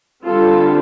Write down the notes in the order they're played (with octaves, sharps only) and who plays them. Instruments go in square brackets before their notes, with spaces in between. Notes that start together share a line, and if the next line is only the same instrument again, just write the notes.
[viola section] D3 G3 C4 F4 A4